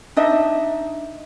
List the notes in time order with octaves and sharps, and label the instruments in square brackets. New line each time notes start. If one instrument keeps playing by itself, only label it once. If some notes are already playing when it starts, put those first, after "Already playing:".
[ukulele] D4 D#4 D#5 E5